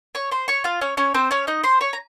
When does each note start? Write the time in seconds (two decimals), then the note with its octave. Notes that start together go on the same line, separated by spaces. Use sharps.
0.15 C#5 C#6
0.31 C5 C6
0.48 C#5 C#6
0.64 F4 F5
0.81 C#4 C#5
0.97 C#4 C#5
1.14 C4 C5
1.31 C#4 C#5
1.47 D#4 D#5
1.64 C5 C6
1.81 C#5 C#6
1.93 A#5